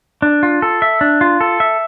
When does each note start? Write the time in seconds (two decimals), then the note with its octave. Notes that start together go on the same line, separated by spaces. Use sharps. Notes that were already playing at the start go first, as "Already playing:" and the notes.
0.22 D4
0.43 F4
0.62 A4
0.82 E5
1.01 D4
1.21 F4
1.41 A4
1.60 E5